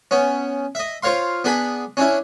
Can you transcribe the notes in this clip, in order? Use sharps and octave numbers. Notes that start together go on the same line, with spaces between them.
B3 C#4
D#5 E5
F4 C5 C#5 F5 C6
B3 D4 G#4 B5
C#4 D4 E4